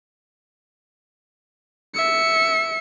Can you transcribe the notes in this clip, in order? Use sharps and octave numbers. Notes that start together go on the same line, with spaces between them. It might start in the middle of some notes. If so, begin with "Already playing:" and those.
E5 C#7